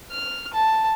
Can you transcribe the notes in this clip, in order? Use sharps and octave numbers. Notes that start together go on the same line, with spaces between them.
F6
A5